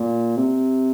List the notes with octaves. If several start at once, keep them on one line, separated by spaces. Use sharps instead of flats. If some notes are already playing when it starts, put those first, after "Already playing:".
Already playing: A#2
C3